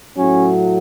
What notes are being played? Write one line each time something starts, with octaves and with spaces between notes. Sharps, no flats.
A2 F#3 C#4